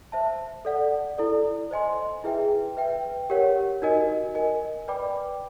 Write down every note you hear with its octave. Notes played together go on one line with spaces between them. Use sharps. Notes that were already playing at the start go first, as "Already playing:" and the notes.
C5 E5 A5
A4 D5 F#5
E4 A4 D5
C5 D#5 G#5 C6
E4 G#4 B4 E5 G5
B4 E5 G5
G4 A#4 C#5 F#5
D#4 F#4 A#4 D#5 G#5
A#4 D#5 G#5
B4 D5 G5 B5 D6